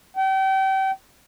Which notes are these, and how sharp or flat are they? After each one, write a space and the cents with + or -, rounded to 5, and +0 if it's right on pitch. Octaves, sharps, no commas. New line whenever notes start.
G5 -35